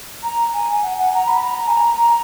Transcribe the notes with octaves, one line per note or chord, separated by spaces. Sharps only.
A#5
G#5
F#5
F#5
A#5
B5
A#5
G#5
A#5